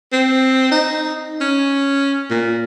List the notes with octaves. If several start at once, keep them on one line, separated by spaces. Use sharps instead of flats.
C4
D#4
C#4
A#2